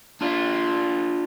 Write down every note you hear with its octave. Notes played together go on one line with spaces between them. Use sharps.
D4 F4